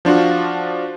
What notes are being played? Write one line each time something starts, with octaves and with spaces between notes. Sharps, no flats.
F3 D4 F4 F#4